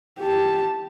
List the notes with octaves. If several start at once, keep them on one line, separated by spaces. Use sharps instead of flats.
G4 A5